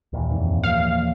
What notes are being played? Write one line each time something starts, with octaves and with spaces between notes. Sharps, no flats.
D#2 A#2 E3
F2 G#2
F3 A#3 F5